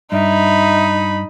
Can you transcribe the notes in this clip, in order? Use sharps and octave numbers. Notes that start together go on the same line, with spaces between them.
G2 D#4 E5 B5